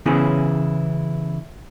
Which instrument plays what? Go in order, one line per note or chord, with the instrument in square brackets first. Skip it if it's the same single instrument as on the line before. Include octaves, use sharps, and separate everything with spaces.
[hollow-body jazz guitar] C#3 E3 B3 C#4 E4 G#4